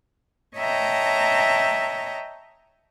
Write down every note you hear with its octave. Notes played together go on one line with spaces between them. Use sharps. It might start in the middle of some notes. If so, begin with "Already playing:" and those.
C#5 D#5 E5 G5 A5 A#5